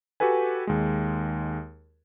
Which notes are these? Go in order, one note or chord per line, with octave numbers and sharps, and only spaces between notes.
F#4 G4 A4 B4 G#5
D#2 G#3